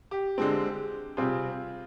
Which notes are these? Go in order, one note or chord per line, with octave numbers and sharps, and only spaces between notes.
G4
D3 G#3 C4
C3 G3 C4 F4 G#4